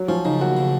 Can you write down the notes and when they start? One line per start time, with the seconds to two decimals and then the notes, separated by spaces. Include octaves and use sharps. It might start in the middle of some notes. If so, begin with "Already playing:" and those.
Already playing: F#3
0.08 F3 C#4
0.25 C#3 D#4
0.41 D#2 F#4
0.57 C#3